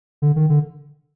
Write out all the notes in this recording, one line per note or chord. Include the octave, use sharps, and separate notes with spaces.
D3
D#3
D3